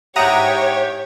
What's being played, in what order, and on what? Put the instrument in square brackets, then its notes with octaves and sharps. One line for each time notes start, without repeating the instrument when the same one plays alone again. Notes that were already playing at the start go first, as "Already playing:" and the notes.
[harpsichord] G#2 E4 [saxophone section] G4 [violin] C#5 [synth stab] F#5 A#5 D#6